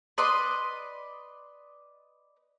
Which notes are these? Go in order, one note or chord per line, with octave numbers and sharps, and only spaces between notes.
B4 D5 D#5 C6